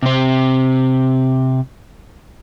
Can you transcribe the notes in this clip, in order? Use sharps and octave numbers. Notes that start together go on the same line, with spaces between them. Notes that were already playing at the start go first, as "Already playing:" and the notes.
C3 C4